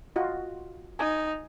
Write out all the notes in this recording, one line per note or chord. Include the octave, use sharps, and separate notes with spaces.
F4 F#4 D#5
D#4 G#5